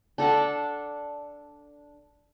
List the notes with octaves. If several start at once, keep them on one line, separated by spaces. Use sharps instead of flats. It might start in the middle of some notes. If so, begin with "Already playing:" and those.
D4 A4 F#5 A5